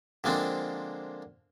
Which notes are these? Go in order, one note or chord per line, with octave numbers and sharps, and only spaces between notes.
D3 F3 G#3 A#3 C4 D4